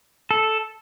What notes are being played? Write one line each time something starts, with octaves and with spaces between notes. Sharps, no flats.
A4